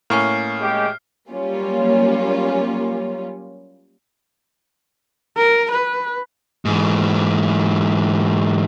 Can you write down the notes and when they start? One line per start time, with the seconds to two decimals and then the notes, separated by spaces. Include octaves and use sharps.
0.10 A2 A#3 C#4 C#6 F6 C7
0.61 G#3 G4
1.29 F#3 G3 A#3 C#4 F4
5.38 A#4
5.72 B4
6.65 G#2 E3